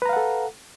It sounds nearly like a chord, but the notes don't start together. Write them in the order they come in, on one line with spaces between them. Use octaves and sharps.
B4 A#5 F5 F#5 A4